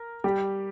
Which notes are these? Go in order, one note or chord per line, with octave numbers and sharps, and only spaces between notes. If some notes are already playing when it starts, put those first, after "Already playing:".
Already playing: A#4
G3 G4